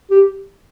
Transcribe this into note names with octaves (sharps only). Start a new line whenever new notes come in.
G4